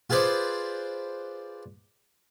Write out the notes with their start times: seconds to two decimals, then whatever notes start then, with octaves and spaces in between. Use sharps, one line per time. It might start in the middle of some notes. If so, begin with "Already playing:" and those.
0.10 F4 G#4 B4 C5 D5